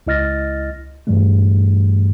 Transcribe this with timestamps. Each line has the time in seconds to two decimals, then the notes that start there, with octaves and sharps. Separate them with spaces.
0.07 C#2 E4 D#5 F6 A6 A#6
1.07 G2 A#2 E3 G3 A3